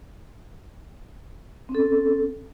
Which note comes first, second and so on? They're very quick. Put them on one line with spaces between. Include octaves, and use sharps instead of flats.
C4 C#4 A4